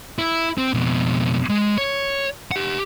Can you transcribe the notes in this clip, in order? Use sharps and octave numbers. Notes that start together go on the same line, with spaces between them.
E4
C4
F2 B2
G#3
C#5
G4 F#5